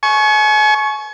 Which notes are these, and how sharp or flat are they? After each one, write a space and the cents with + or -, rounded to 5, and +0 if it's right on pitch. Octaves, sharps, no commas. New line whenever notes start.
G#5 +40 C#6 +0